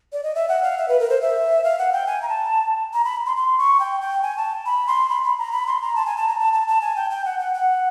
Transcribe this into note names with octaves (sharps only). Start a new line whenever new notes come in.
D5
D#5
E5
F#5
F5
E5
B4
A#4
C5
E5
F5
F#5
G5
G#5
A#5
A5
A#5
B5
C6
C6
C#6
G5
G5
G#5
A5
B5
C6
B5
B5
A#5
B5
C6
A#5
A5
G#5
A5
A#5
A5
A5
A5
G#5
G5
G5
F#5
F#5
F#5